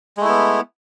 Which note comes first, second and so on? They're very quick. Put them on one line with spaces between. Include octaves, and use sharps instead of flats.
G#3 A3 E4 B3